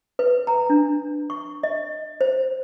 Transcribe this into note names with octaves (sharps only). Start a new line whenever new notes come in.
B4
A#5
D4
C#6
D#5
C5